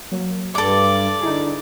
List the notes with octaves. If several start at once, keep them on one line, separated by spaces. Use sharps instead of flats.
F#3 A#3
G2 A4 D5 D6
D3 D#4 E4 G#4